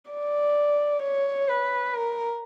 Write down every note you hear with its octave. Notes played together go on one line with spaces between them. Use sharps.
D5
C#5
B4
A#4